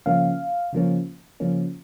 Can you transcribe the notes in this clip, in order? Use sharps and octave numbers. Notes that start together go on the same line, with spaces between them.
C#3 F3 A#3 C#4 F5
C#3 F3 A#3 C#4
C#3 F3 A#3 C#4